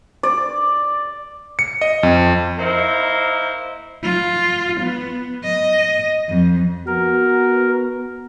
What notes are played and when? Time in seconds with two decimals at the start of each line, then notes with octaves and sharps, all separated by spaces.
0.23 D5
1.59 C#7
1.81 D#5
2.03 F2
2.59 A#3 D#4 E4 A#4 C5
4.04 F4
4.80 B3
5.44 D#5
6.28 F2
6.87 B3 F#4 A#4